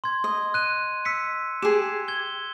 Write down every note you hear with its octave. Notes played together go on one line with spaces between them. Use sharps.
C6 G#6
D#5
F#6 D#7
E6 B6 C#7
G4 G#4 E7
G#6 G7